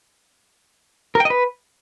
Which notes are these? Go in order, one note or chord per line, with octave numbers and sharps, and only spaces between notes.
A#4
G5
D#5
B4